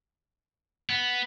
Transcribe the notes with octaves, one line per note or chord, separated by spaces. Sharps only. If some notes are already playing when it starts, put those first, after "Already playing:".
B3